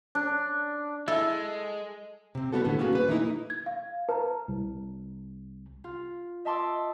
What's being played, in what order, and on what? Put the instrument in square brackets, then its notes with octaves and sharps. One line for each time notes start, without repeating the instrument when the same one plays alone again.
[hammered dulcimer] D4
[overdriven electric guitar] G#3 [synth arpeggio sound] E4 [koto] A4
[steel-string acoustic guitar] C3 C4
G3 B3 D#4 F#4 A4
A2 D3 E3 B3
A#3 B3 C#4 F#4 G#4
G3 B4
D#3 E3 A3 A#3 D#4 E4
[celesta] G#6
F5
[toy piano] B4 [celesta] A5 A#5
[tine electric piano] C2
[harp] F4
D#5 E5 A5 C6 D6 E6